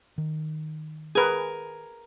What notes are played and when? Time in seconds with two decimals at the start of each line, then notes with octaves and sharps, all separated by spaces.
0.18 D#3
1.15 G#4 A#4 B4 G#5